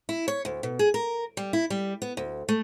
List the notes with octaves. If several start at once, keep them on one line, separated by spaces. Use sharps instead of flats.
E4
C#5
D2
B2
G#4
A#4
G3
E4
G3
B3
D2
A3